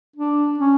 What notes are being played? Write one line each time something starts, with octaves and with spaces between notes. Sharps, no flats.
D4
C#4